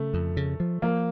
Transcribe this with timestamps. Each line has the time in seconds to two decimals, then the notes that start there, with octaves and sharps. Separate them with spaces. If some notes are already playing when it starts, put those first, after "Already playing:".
Already playing: C#3 A3
0.14 F2
0.37 C#3
0.60 F3
0.82 F3 A#3